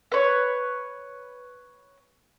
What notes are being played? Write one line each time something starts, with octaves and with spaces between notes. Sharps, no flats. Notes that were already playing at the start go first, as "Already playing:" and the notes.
B4 C#5